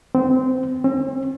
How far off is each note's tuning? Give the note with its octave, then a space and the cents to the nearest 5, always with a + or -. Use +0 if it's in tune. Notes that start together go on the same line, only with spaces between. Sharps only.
C4 -20
C4 +45